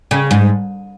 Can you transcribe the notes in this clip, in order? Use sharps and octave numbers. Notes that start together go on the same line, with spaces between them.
C#3
G#2